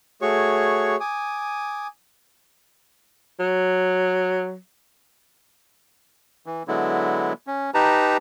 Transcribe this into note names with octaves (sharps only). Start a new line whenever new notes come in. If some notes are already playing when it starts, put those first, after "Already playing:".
A3 F#4 G#4 C#5 C#6
G#5 D6 D#6
F#3
E3
D3 F#3 G#3 B3 E4
C#4
D#4 G4 B4 A5 A#5